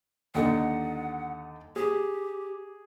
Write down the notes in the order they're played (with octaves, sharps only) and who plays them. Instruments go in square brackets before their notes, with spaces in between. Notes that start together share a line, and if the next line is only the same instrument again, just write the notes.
[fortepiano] D#2 D3 D#4 [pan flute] F#5
[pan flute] G4 [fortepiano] G#4